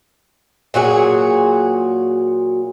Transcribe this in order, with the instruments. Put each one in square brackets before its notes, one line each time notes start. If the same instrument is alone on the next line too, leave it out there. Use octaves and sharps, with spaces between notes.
[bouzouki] A#2 F#3 F#4 G#4